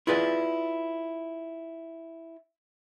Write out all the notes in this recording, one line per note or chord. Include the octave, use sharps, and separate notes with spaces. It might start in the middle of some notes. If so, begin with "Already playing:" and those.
E4 F4 G#4 B4 D5